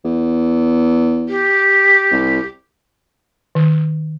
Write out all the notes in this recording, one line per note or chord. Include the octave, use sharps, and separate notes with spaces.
E2
G4
C2
D#3